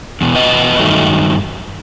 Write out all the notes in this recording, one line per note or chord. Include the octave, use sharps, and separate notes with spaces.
E2 B2
B4 D#5
G2 D#3 F#3 A3